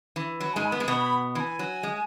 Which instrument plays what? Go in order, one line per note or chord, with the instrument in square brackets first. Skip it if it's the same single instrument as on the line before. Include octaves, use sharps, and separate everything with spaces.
[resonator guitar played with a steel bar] E3
[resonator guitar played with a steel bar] F#3 [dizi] B5
[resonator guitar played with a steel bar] G#2 G#3 [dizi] G#5
[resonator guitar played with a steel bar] B3 [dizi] B5
[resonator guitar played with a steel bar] G#3
B2 B3
[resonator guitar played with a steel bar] E3 [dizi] B5
[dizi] G#5
[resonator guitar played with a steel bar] F#3
G#3